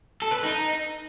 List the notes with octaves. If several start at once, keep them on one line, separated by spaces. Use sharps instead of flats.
A4
B4
D#4